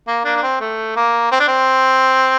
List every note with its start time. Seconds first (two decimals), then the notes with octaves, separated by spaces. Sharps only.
0.07 A#3
0.25 A#3 D4
0.36 D4
0.42 C4
0.61 A3
0.96 A#3
1.32 C4
1.40 D4
1.48 C4